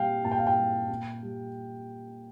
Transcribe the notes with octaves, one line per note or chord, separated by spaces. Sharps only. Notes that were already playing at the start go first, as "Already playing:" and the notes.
Already playing: A#2 G3 F5 G5
A#2 A5
G5
F5
G5
G3
A#2
G3